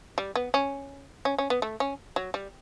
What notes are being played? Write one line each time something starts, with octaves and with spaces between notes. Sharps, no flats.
G3
B3
C#4
C#4
C#4
B3
A3
C#4
F#3
G3